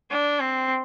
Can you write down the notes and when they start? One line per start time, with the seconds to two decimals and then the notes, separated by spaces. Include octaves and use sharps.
0.11 D4
0.40 C4